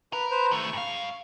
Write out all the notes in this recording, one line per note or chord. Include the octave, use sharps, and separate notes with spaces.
A#4 B4
B4 C5
D#3 A3 C#6
G2 F5